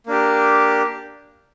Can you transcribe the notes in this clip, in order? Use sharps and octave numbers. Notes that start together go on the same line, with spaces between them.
A#3 D4 G4